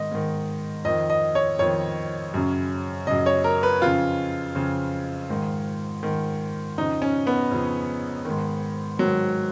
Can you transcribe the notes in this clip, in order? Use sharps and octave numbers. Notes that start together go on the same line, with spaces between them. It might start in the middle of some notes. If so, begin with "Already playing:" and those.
Already playing: G#2 D#3 D#5
G#2 D#3
F2 D#3 D#5
D#5
C#5
F2 D#3 C#5
F#2 C#3
F#2 C#3 D#5
C#5
A#4
B4
F2 C#3 F4
F2 C#3
G#2 D#3
G#2 D#3
F2 C#3 D#4
C#4
B3
F2 C#3
G#2 D#3
G#2 D#3 F#3